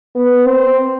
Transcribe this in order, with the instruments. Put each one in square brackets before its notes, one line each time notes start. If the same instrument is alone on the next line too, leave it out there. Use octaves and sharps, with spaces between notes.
[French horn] B3
C4